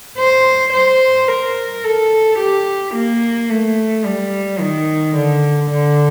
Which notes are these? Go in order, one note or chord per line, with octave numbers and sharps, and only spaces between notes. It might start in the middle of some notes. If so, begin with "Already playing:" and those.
C5
C5
A#4
A4
G4
A#3
A3
G3
D#3
D3
D3